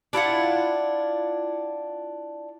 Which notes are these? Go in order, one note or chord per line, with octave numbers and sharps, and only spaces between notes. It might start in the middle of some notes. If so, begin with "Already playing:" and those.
D4 E4 F4 F#5